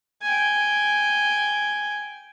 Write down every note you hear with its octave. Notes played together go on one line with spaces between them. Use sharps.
G5 G#5